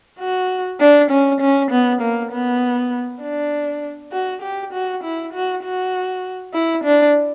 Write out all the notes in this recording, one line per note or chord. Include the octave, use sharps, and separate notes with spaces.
F#4
D4
C#4
C#4
B3
A#3
B3
D4
F#4
G4
F#4
E4
F#4
F#4
E4
D4